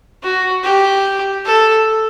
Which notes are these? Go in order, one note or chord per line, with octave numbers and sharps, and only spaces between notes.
F#4
G4
A4